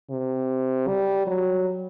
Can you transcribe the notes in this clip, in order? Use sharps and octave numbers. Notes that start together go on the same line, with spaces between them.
C3
G3
F#3